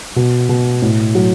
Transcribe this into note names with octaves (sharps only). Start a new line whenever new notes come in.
B2
B2
A2
F#3